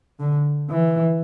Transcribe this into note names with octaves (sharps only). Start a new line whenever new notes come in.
D3
E3